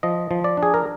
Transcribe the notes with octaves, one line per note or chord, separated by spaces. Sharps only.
F3 D#5
F3
D5
D4
G#4
A#4